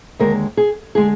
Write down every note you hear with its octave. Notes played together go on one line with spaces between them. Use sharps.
D#2 D3 G#3 A#4
G#4
D3 G#3 G#4